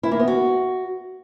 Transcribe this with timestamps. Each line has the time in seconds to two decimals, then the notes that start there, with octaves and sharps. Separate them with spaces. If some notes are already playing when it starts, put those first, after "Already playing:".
0.03 E4
0.11 A#3
0.19 B3
0.28 F#4